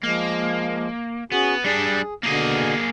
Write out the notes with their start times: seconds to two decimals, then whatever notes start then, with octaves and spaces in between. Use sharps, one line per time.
0.03 F3 G#3 A#3
1.32 B3 C#4 F#4 G#4
1.64 G3 D4 G#4
2.23 B2 D3 A#3 G#4